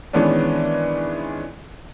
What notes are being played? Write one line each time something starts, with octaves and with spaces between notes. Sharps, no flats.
D#3 E3 G#3 B3 C#4 D4